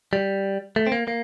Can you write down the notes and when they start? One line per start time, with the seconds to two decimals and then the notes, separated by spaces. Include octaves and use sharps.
0.13 G3
0.76 A3
0.87 C4
0.92 A#3
1.08 A#3